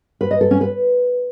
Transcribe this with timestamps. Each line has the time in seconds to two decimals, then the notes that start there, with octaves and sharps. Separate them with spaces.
0.21 B4
0.31 D#5
0.41 A4
0.51 C#4
0.61 B4